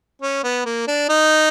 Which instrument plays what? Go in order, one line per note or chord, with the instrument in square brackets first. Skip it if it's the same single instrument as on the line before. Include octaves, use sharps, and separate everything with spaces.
[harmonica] C#4
B3
A#3
D4
D#4